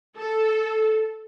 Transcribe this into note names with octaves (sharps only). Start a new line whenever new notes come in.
A4